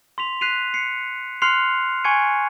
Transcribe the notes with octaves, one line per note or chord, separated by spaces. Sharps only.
C6 B6 F7
F#6 B6 C7 D#7 F7
C7 C#7
C6 F6 F#6 C7 C#7 F7
G#5 C6 C#6 G#6 C#7 D#7